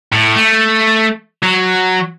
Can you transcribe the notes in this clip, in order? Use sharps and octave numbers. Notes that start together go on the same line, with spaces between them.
A2
A3
F#3